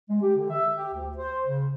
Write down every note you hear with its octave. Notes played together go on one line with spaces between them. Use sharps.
G#3
G4
D3
E5
G4
D2
C5
C#3